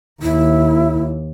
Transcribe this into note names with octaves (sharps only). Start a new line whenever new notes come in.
D#2 E4